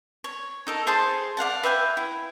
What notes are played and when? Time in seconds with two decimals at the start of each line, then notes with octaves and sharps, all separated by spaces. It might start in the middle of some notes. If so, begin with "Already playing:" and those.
0.24 C#5
0.67 D#4 A4 A#4
0.87 G#4 C5 A5 C6
1.37 D5 F5 F#5 A5
1.63 B4 E5 G5 G#5
1.97 E4